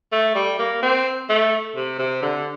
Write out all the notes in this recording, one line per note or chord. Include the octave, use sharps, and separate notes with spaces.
A3
G3
A#3
C4
A3
C3
C3
D3